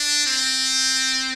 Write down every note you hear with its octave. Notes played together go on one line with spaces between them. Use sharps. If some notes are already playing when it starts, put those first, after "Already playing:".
Already playing: D4
C4